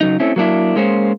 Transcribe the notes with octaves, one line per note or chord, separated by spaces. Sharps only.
C#3 F#3 D#4
A3 C4 C#4 E4
F#3 A#3 D4 E4
G#3 A#3 C#4 C5